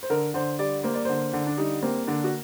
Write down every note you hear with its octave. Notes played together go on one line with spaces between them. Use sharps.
C5
D3 A#4
D3 C5
G3 D5
A#3 C5
D5
D3 C5
D3
D4
G3 D#4
A#3 C4
D3 D4
F#4